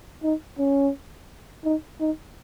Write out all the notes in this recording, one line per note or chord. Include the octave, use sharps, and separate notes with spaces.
D#4
C#4
D#4
D#4